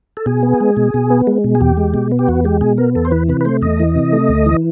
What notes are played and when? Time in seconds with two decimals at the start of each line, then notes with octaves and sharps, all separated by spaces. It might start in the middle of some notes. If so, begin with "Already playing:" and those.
0.17 A4
0.26 B2 G#4
0.43 B3
0.60 G#3
0.77 B2
0.94 B2
1.10 B3
1.27 G#3
1.44 B2
1.55 G#4
1.60 E2 G4
1.77 G#3
1.94 B2
2.12 B3
2.19 G4
2.29 E2 F#4
2.44 G#3 G4
2.61 B2 G#4
2.78 B3 A#4
2.95 E2 A4
3.05 C5
3.11 E3 B4
3.29 C3 B4
3.41 B4
3.45 A3 C5
3.62 E2 D#5
3.80 E3
3.95 C3
4.12 A3
4.29 D2
4.46 E3